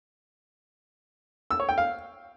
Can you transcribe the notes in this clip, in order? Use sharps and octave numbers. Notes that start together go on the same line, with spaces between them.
E6
C#5
G5
F5